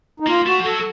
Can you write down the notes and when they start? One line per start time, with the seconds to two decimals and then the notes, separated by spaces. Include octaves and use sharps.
0.20 D#4
0.27 A#3 F4
0.46 A3 F#4
0.60 F3
0.65 F#3 A4